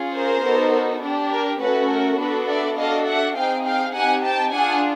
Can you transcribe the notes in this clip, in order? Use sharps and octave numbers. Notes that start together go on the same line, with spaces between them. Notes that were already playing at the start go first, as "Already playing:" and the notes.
Already playing: C#4 F4 G#4
A#4 C5
B3 D#4 F#4 A4
D4 G4
A#4
A3 C#4 F#4 A4 B4
A#4
B3 D4 F#4 A4 B4
D5 E5
D4 F#4 A4 D#5 F5
E5 F#5
C4 D#4 G#4 F5 G5
F5 G5
C4 D#4 G4 F#5 G#5
G5 A5
D4 F4 G#4 F#5 G#5